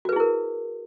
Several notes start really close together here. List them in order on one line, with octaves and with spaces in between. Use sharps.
F#4 B4 G#4 E4 A#4